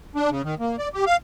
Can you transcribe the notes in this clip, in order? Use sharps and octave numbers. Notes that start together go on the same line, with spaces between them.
D4
C#3
D#3
A#3
D5
G4
F5